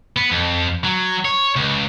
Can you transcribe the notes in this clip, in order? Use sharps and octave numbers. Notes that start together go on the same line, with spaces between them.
B3
F2
F#3
C#5
C#2